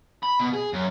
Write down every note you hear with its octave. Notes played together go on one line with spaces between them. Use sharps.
B5
B2
G#4
F#2